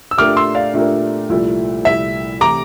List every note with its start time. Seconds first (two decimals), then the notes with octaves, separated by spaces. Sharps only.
0.11 E6
0.17 A#2 A3 D4 G4 A#4 D6 F6
0.37 C6 E6
0.55 D5 F5
0.74 A#2 A3 D4 G4 A#4
1.29 C2 A#2 F3 A3 E4
1.85 C2 A#2 F3 A3 E4 E5
2.41 C3 E3 A3 E4 A#5 D6